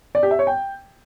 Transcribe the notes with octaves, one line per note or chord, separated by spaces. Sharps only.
D5
G4
E5
C#5
G5